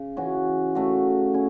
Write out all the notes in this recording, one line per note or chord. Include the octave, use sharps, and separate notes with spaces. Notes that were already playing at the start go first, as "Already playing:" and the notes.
Already playing: C#3
E3 C#4 F#4
C#3 A3 F#4
C#4 E4